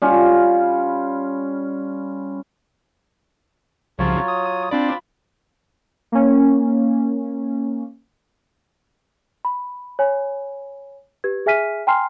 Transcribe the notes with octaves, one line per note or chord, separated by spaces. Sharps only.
G3 C#4 F4
C2 C#3 F3 F#3 F4 C#5
D#6
C4 D4 F4 D5 B5
A#3 C#4
B5
C#5 G#5 B5
G4 B4 G#6
G#4 E5 G#5 F6 B6 D#7
G5 G#5 A#5 C6 F6 C7